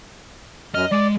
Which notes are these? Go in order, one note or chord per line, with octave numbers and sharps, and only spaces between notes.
F#2 D#5 F6
G#3 D5